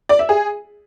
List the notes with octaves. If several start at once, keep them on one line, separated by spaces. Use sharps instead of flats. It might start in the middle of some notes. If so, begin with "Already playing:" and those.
D5
E5
G#4